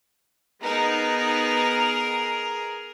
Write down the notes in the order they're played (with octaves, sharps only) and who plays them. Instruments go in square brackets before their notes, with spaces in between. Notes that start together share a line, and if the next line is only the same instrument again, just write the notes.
[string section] B3 D#4 [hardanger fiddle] G#4 A#4